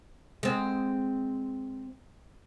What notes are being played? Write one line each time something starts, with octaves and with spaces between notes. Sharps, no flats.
G#3 C4